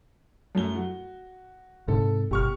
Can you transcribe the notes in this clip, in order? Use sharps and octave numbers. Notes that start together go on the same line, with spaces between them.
F#2 A3 G7
F#4
G#2 C3 A4
G1 B2 G4 C#6 F6